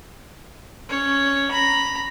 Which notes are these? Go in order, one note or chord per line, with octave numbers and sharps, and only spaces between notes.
C#4 C#5
A#5 B5